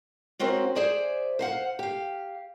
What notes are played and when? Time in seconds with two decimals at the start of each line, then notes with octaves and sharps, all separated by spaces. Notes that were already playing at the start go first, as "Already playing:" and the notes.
0.39 G#3 C4 C#4 F#4 A#4
0.75 G#4 C5 D5 E5 G#5
1.39 C5 F5 F#5
1.79 G4 F5